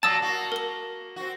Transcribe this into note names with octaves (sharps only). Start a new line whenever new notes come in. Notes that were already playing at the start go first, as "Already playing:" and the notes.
A#2 F#3 A#3 A5 D#6 E6 A6
A#3 F#4
A#4 G7
C4 F#4